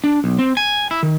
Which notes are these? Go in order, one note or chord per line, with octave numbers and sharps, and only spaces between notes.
D4
B1
C4
G#5
E4
D#3